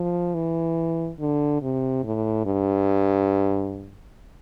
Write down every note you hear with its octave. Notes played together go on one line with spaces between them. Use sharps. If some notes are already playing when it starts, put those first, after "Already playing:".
Already playing: F3
E3
D3
C3
A2
G2